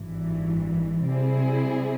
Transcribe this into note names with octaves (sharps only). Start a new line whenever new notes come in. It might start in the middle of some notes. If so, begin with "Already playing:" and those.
Already playing: G#1 G2 E3
C3 G3 C4 E4 G#4